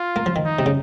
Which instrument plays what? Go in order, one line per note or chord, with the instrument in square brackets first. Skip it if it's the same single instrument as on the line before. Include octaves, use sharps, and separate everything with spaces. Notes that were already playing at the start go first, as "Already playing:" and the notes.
Already playing: [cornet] F4
[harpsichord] A#3
F3
D#3
[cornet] D#4
[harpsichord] C3
C#3